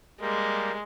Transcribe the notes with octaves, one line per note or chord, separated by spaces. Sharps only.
G3 G#3 A#3